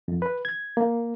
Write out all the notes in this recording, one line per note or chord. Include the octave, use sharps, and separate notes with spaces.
F2
B4
G#6
A#3